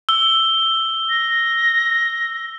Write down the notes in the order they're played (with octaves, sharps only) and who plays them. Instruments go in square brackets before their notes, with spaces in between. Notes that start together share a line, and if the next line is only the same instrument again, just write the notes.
[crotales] E6 G7
[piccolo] A#6